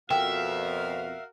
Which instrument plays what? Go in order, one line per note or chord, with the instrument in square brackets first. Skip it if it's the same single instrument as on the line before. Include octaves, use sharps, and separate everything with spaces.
[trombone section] F2 B2 [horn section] F#4 A#4 F5 [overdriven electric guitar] E5 [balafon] G5